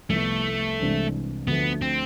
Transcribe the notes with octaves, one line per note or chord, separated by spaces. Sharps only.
C2 C3 F3 A3 B3 E4
C2 C3 E3 G#3 D4
D2 D3 F3 A3 B3
C4